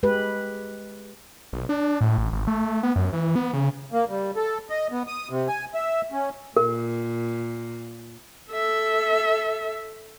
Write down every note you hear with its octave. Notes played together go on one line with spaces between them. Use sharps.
G#3 G4 B4
B1
D4
A2
A1
G#1
A3
B3
F#2
E3
B3
C#3
A#3
G3
A4
D#5
B3
D#6
C3
G#5
E5
C#4
A#2 A#4
A4 E5